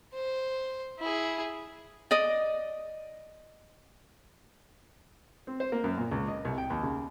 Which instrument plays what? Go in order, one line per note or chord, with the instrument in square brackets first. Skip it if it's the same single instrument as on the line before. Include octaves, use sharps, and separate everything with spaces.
[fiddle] C5
E4 G#4
[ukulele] D5 D#5
[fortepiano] C4
C5
A#3
F#2
A#2
C#2
D#5
C2
G5
D#2
C#3